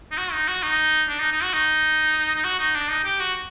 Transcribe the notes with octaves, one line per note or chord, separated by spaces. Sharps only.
D#4
F#4
D#4
F#4
D#4
D4
D#4
D#4
F#4
D#4
D#4
F#4
D#4
D4
D#4
G4
F#4